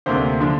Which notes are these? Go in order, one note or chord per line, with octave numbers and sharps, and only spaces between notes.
D2 C3 A#3 D4 C5
D3 F3 D4